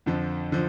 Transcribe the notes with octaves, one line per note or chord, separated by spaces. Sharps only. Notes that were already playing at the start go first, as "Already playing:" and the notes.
F2 D3 F3
D3 F3